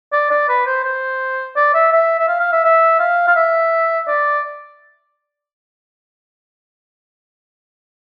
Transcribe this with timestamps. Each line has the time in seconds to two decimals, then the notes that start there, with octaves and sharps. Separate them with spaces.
0.13 D5
0.31 D5
0.49 B4
0.66 C5
0.84 C5
1.56 D5
1.74 E5
1.92 E5
2.19 E5
2.28 F5
2.40 F5
2.52 E5
2.65 E5
3.00 F5
3.28 F5
3.36 E5
4.08 D5